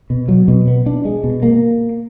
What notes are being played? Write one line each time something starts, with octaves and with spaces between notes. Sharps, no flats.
B2
F#3
B2
B3
D4
G#3
B2
A#3